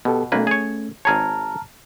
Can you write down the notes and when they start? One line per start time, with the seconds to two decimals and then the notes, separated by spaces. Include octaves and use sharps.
0.05 B2 B3 G4 A4
0.32 B1 A3 A#3 C#4 B4
0.47 G#4 C#5
1.05 G#1 G#4 C#5 A5 A#5 F6